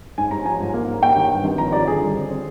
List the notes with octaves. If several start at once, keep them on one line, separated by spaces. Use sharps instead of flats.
G#2 G#5
G#2 A#5
F3 G#5
G#2
A#3
A#3
A#3 G5
D#3
G2
G#1
F3 A#5
F3 D5
D3 G#4
G3
C4
C4